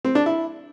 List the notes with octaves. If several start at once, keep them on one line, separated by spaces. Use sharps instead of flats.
C4
D4
E4